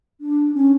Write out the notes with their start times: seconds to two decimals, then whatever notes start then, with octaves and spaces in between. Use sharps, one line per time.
0.21 D4
0.54 C#4